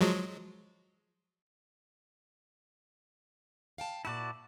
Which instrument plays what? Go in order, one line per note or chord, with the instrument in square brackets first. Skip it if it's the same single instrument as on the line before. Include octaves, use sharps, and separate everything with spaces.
[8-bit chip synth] F3 F#3 G#3
[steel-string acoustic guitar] F5 G5 A5
[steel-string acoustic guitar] A#2 A5 [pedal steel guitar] E4 F#4 D5